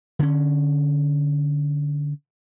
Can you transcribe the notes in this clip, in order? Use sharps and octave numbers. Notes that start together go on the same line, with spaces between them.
D3 C#4